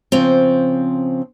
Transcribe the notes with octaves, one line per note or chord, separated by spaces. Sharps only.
C#3 F3 C4